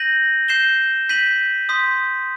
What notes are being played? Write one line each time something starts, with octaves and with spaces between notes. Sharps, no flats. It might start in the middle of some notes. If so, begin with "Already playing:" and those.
Already playing: G6 A#6 D#7 F#7
G6 C7 E7 G7
G6 B6 D#7 F#7
C6 D#6 G6 B6